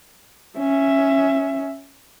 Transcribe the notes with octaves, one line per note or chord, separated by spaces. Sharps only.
C#4 E5